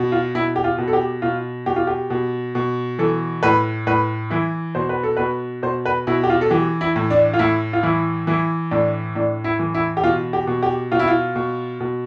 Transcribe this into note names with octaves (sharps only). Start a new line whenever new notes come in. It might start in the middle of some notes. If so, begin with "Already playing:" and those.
Already playing: B2
F4
B2 E4
G4
F4
B2
A4
G4
B2 F4
B2 G4
F4
G4
B2
B2
E3 A4
A2 B4
A2 B4
E3 E4
B2 C5
B4
A4
B2 B4
B2 C5
B4
B2 E4
G4
F4
A4
E3 G4
E4
A2
D4
F4
A2 E4
F4
E3 E4
E3 E4
A2 D4
A2 D4
E4
E3
E4
G4
B2 F4
G4
B2
G4
B2 F4
E4
F4
B2
B2